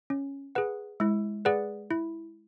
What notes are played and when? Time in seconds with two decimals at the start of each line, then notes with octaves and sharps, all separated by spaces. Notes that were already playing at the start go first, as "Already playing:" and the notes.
0.10 C#4
0.55 G#4 B4 F#5
1.00 G#3 E4
1.45 G#4 B4 D5 F#5
1.91 E4